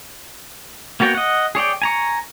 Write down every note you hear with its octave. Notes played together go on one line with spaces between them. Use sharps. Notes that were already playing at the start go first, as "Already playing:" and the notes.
A#3 B3 F#4 C#5 G5
D#5 F#5
G#4 C#5 D5 G5
G#5 A#5 C#6